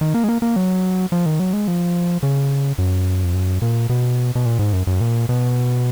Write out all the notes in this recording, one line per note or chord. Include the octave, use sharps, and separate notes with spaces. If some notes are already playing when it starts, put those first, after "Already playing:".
D#3
A#3
G#3
A#3
A#3
F#3
F3
D#3
F#3
G#3
F3
C#3
F#2
F2
F#2
A#2
B2
B2
A#2
G#2
F#2
F#2
A#2
B2